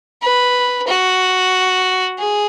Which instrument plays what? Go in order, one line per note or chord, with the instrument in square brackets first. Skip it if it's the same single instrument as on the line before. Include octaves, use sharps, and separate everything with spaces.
[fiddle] B4
F#4
G#4